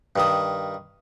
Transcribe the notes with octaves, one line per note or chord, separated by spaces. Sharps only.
G2 D#3 D#6